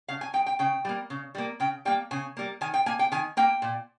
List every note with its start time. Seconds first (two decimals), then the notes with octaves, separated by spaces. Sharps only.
0.08 C#3 F5
0.21 G#5
0.33 G#3 G5
0.46 G5
0.59 C#3 G5
0.85 G3 A#3
1.10 C#3
1.35 G3 A#3
1.60 C#3 G5
1.85 G3 A#3 G5
2.11 C#3 G#5
2.37 G3 A#3
2.61 D#3 G#5
2.74 G5
2.86 A#3 G#5
2.99 G5
3.12 D#3 G#5
3.37 A#3 G5
3.62 A#2